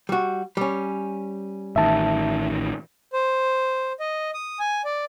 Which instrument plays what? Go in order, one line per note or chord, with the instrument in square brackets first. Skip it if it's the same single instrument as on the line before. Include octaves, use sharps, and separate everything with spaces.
[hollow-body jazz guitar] G3 F#4
G3 C#4
[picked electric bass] A1 D#3 [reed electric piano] E5 A5
[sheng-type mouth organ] C5
D#5
D#6
G#5
D5